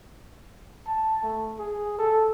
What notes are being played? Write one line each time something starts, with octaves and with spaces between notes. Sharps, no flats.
A5
A3
G#4
A4